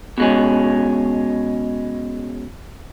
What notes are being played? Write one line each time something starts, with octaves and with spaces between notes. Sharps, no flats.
B2 G#3 C#4